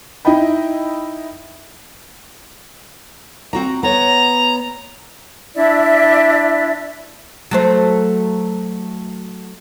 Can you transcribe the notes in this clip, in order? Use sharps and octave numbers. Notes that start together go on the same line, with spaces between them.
D#4 E4 D#5 E5 G5 B5
C4 F#4 A#5
B3 C#5 A#5
D4 E4 D5 E5
F#3 A3 C5